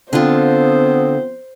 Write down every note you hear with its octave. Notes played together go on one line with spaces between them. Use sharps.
D3 F3 B3 C4 F4 C5